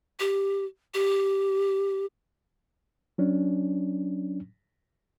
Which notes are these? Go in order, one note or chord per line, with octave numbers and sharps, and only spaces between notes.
G4
G4
F#3 C#4 D4